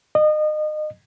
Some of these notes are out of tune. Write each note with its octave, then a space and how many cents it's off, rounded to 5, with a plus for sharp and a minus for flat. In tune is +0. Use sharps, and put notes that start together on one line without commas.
D#5 -30